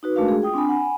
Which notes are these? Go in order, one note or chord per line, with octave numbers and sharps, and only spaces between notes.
D#4 F#4 B4
G#3 A3 D4 F#4 A#4 F5
G#4
F4 G5 D#6
C4 D4 G#5 B5
F#5 G#5 B5